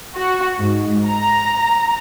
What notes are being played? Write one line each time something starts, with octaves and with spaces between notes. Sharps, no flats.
F#4
G#2
A#5